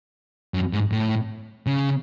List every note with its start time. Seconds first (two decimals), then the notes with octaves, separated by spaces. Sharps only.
0.54 F#2
0.73 G#2
0.92 A2
1.67 C#3